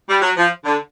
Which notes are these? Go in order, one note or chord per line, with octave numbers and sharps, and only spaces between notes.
G3
F#3
F3
D3